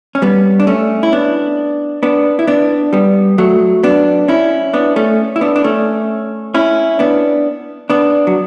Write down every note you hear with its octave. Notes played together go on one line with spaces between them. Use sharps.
C#4
G3 B3
D4
A3 C#4
E4
B3 D4
B3 D4
E4
B3 D4
G3 B3
F#3 A3
B3 D4
C#4 E4
B3 D4
A3 C#4
E4
B3 D4
D4
A3 C#4
C#4 E4
B3 D4
B3 D4
F#3